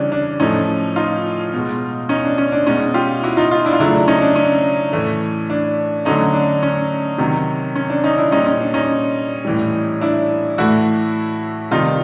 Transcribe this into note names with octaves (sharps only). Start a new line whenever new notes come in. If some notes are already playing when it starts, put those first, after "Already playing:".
Already playing: C#3 E3 G3 C#4 D4
D4
A2 F3 A3 C#4 D#4
D#4 F4
B2 G#3
C#4 D#4
D4
C#4
D4
B2 G#3 C#4 D#4
F4 G4
E4 F#4
D#4 F4
D#4 F4
D4 E4
F4
C#3 F#3 A3 D4 E4
C#4 D#4
D4
C#4
A2 E3 A3
D4
D3 F#3 A3 C#4 D#4
D4
C#4
C3 D#3 F#3
C#4
D4
C#4 D#4
D4 E4
A#2 G3 C#4 D#4
C#4
D4
C#4 D#4
A2 E3 G3
D4 E4
A2 E3 A3 E4 F#4
C3 D#3 G3 D#4 F4